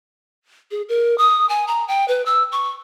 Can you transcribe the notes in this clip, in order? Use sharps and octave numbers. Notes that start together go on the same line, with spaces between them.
G#4
A#4
D#6
G#5
A#5
G5
B4
E6
C#6